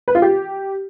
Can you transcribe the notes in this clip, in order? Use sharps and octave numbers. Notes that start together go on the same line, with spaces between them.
B4
F4
G4